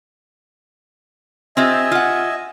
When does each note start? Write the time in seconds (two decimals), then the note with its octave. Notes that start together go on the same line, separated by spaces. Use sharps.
1.57 C4 F4 G4 D#5 E5 G#5
1.92 F4 F#5